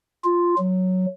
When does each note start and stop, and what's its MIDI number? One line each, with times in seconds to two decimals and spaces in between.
0.24 0.54 65
0.59 1.06 54